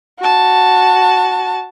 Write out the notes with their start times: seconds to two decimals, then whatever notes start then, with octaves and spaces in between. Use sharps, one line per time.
0.19 F#4 A5